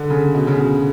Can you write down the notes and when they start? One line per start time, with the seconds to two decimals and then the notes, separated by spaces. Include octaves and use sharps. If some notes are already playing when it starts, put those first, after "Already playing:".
Already playing: D3
0.10 C#3
0.34 B2
0.47 C#3
0.58 B2